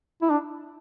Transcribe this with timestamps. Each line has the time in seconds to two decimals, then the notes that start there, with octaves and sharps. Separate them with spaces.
0.22 E4
0.30 D4